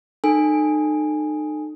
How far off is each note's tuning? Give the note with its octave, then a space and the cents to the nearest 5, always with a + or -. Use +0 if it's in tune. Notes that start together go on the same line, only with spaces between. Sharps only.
D#4 -35 A4 +0 G#5 -10